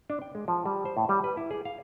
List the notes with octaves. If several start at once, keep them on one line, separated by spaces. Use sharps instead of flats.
D4
G5
G#3
F3
G3
C5
A2
G3
B4
E4
G#4
F5